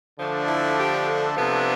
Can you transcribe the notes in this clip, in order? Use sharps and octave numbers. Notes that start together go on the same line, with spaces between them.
D3 F3 A3 D4
E4
G4
A4
C3 F3 B3 D4